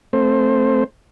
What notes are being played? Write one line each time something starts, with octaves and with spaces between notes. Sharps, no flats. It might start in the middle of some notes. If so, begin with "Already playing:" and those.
A3 C4 C5